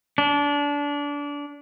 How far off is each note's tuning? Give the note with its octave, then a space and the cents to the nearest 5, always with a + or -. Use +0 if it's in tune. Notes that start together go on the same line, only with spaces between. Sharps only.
D4 -25